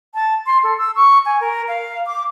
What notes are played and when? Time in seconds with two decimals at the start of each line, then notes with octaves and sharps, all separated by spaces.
0.14 A5
0.46 C6
0.63 A4
0.78 E6
0.96 C#6
1.25 G#5
1.40 A#4
1.68 F5
2.06 D6